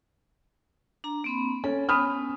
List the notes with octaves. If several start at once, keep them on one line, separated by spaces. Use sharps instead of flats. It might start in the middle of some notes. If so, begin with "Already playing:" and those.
D4 A#5
A#3 C4 B5
C#4 A4
B3 C#4 G#5 B5 D#6 F6